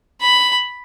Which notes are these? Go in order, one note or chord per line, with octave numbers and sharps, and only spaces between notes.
B5